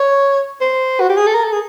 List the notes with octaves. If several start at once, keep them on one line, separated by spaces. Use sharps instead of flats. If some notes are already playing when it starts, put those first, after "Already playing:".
Already playing: C#5
C5
F#4
G4
G#4
A4
A#4
A4
G#4